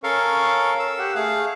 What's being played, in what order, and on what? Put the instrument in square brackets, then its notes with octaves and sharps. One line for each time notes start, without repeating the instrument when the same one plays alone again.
[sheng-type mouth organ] C#4 C#6 [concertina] A4 A#4 F5
[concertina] E6
[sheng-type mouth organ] G4 F#5
[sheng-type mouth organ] A3 [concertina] G#4 F5